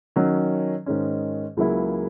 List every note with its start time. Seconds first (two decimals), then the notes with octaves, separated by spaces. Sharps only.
0.16 D#3 F#3 C#4
0.86 G#2 D#3 G#3 C#4
1.57 C#2 C#3 F#3 A#3 E4